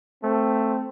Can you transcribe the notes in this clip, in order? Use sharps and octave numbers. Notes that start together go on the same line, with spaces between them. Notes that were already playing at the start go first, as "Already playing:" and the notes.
A3 C4